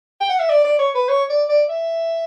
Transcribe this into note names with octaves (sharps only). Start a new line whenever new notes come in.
G5
F#5
E5
D5
D5
C#5
B4
C#5
D5
D5
E5